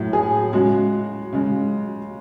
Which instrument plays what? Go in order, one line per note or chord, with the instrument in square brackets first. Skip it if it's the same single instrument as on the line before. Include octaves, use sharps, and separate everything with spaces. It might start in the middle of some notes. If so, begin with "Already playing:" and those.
Already playing: [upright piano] A2 F#3
G#4
C#3 G#3 F#4
C#3 G#3